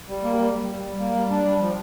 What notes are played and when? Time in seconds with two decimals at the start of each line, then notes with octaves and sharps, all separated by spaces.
0.09 G3
0.23 A#3
0.39 G3
0.54 G3
0.69 G3
0.84 G3
1.00 A#3
1.15 G3
1.30 D4
1.45 G3
1.60 F3